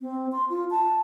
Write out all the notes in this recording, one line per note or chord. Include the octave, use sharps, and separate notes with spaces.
C4
C6
F4
A5